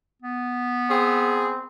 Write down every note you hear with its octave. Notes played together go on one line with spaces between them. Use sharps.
B3
C4 G#4